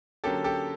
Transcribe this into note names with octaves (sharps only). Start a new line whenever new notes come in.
D3 F#3 A#3 C#4 G4 A4
G4 A4